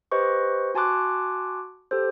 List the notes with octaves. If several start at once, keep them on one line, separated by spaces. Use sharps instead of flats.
G4 B4 C5 D#5 C#6
F#4 G#5 A5 C6 D6 F#6
G4 A4 C5